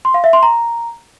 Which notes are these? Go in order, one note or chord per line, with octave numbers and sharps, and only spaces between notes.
C6
F5
E5
C6
A#5